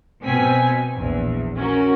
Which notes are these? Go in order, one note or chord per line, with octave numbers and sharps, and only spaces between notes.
B2 C4 G#5 B6
A#1 E2
C#4 F#4 A#4